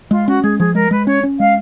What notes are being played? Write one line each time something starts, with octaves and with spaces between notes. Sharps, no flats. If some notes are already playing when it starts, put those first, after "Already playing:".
G#3 F4
C#4 F#4
G#3 G#4
F3 G#4
G#3 A#4
G#3 B4
C#4 C#5
C#4
G#3 F5